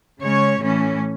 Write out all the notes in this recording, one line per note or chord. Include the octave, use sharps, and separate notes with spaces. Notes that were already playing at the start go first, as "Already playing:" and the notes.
C#3 G#3 C#4 C#5
A2 E3 A3 C#4